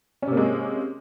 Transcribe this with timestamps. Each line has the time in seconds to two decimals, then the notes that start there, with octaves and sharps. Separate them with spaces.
0.22 C#4
0.27 C3
0.32 A#3
0.37 G#3